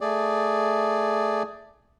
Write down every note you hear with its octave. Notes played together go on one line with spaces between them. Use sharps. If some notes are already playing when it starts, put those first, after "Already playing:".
A3 G#4 D5